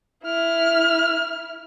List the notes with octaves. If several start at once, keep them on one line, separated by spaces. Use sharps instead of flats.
E4 F6